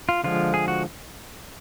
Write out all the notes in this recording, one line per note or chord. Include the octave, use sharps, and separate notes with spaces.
F4
D3 F3 G#3 F4
G#4
F#4